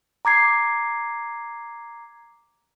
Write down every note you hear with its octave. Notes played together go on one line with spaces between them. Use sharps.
A#5 D6 G#6 C7